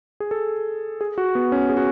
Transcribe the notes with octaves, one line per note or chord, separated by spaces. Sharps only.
G#4
A4
G#4
F#4
B3
C#4
G#4
F#4